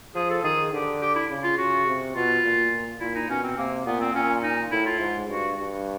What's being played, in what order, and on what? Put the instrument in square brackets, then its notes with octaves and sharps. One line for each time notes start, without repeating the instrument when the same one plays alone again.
[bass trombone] F3 [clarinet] G#4
[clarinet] A4
[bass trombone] D#3 [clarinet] G#4
[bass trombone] D3 [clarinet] G4
[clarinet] G4
E4
[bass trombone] C#3
[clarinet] F4
[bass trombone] C#3 [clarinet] F#4
[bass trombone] C3
[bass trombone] B2 [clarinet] F4
[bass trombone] A#2
[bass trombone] A#2 [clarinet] E4
[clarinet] D#4
[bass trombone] B2 [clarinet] C#4
[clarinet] C4
[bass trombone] C3 [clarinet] A#3
[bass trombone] A#2 [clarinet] B3
[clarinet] C4
[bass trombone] A#2 [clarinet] C#4
[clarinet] D#4
[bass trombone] A2 [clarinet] E4
[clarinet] F4
[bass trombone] G#2
[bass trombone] G2 [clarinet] F#4
[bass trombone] G2 [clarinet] F#4